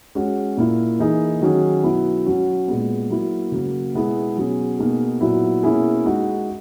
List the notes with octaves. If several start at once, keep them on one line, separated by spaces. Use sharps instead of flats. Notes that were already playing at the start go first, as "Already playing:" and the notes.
G#3 C#4 F#4
A#2 A#3 E4
E3 A#3 D#4 G#4
D#3 F#3 C#4 G#4
B2 F#3 B3 E4
F#3 C#4 F#4
A#2 G#3 B3
F#3 A#3 E4
C#3 F#3 A#3
B2 G#3 B3 E4 G#4
B2 F#3 C#4 G#4
B2 A#3 D#4 G#4
A#2 F#3 B3 E4
B2 A#3 C#4 E4 G#4
G#3 D#4 F#4